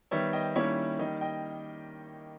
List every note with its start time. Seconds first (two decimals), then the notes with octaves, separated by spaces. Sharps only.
0.11 D#3 G3 B3 C#5 E5
0.33 D#5 G5
0.55 D#3 G3 A#3 C#4 E4 C#5 E5
0.99 D#3 G3 A#3 D#5
1.21 D#5 G5